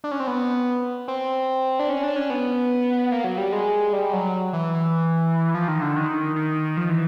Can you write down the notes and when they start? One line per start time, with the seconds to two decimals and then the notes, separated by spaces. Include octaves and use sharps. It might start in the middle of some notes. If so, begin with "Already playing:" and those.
0.04 D4
0.12 C#4
0.20 C4
0.27 B3
1.08 C4
1.79 D4
1.90 C#4
2.03 D4
2.16 C#4
2.30 B3
3.12 A#3
3.24 F#3
3.38 G3
3.52 G#3
3.93 G3
4.13 F#3
4.53 E3
4.74 E3
5.54 F3
5.68 D#3
5.82 D3
5.96 D#3
6.36 D#3
6.77 F3
6.89 E3